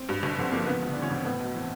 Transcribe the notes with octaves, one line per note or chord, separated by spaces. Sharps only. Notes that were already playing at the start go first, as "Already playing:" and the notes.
Already playing: C4
G2
G1
D3 C4
F3 A#3
C#3 B3
D2
E3 D4
C#4
D2 C4
A2 B3
B1
E3 C4